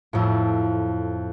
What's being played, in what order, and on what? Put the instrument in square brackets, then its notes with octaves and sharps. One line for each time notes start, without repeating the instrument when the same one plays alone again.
[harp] F2 A2